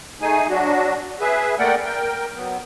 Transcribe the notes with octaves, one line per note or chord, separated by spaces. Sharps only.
A3 D#4 G#4 G#5
F#3 D4 F#4
G#4 B4 E5
A3 A#3 A#4 D5 F#5 G5
A#4 G5
F#3 B3